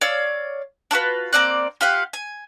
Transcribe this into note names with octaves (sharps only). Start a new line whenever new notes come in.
C#5 D5 F5 E6
D4 F4 F#4 B4
A#3 C4 D5 F#6
F4 G4 F5 F#5
G#5